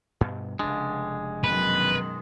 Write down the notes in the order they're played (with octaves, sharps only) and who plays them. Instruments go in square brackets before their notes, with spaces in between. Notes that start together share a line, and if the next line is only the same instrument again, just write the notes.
[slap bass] G2 B2
[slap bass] F1 D4 [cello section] C#3 [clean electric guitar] G#3
[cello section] F#2 B2 D#3 [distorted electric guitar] B4